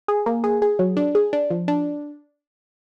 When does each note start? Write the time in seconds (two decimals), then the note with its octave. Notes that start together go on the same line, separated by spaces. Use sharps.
0.08 G#4
0.26 A#3
0.44 G#4
0.62 G#4
0.79 F#3
0.97 D4
1.15 G#4
1.33 D4
1.50 F3
1.68 D4